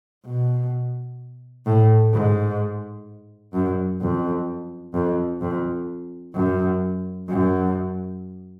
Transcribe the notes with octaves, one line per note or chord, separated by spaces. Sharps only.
B2
A2
G#2
F#2
F2
F2
F2
F#2
F#2